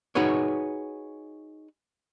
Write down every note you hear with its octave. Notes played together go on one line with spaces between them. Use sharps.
D#4 F#4 G#4 B4 C#5